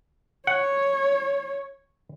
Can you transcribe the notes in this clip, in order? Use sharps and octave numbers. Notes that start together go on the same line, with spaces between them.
C#5 F#5